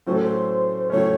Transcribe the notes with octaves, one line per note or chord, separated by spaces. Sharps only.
A2 F#3 A3 C#4 C5
A4
C5
A2 F#3 A3 C#4 C#5